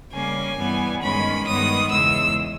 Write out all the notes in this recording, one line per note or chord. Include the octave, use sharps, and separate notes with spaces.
C#3 G3 A#3 C#4 G#5
G2 E3 G3 B3
G2 D#3 G#3 C#4 B5
G2 D#3 G#3 B3 D#6
E2 C#3 G#3 E6